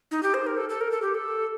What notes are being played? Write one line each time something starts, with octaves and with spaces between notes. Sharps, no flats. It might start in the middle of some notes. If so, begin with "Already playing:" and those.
D#4
G4
C5
A#4
A4
A4
A#4
A4
G4
A4